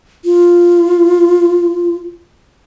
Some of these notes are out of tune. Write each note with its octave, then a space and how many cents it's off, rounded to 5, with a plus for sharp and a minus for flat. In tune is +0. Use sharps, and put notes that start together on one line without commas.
F4 -5